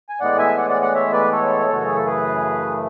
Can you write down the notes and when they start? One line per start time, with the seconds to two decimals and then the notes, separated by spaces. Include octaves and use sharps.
0.09 G#5
0.20 A2 E3 G#3 B3 D5 F#5
0.38 E5 G#5
0.57 D5 F#5
0.69 D5 F#5
0.82 D5 F#5
0.94 C#5 E5
1.13 B4 D5
1.32 A4 C#5
1.68 F#2 C#3 E3 A3 F#4
1.84 G#4
1.95 A4
2.06 G#4 B4